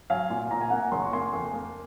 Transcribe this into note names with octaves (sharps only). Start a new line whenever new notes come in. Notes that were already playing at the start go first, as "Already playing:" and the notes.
F#3 F5 G#5
A#2
A#2 A#5
G#5
A#3 F#5 A#5
F#1 C6
C#6
A#3 G#5 C6
F2
A#3